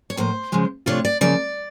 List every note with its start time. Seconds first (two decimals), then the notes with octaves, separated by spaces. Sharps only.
0.10 C#5
0.17 A2 F3 A#3 C5
0.52 C#3 F3 G#3
0.86 C3 F3 A3 D4 F4 C#5
1.05 D5
1.21 C#3 F3 A#3 D5